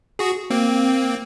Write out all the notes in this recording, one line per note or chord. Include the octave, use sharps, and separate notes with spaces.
F#4 G#4
A#3 C4